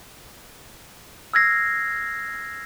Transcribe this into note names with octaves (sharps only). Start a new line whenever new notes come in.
E6 F6 G#6 A#6 C7